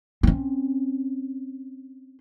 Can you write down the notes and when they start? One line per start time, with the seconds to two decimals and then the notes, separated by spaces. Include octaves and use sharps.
0.23 C4 C#4